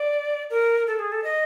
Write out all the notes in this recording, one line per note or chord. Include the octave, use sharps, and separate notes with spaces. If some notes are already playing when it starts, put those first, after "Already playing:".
Already playing: D5
A#4
A4
G#4
A4
D#5